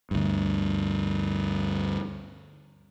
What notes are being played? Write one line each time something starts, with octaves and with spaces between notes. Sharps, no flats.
D2 G2